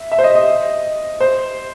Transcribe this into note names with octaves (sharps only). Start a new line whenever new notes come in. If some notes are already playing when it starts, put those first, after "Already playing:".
Already playing: E5
E5
C5
D#5
D#5
C5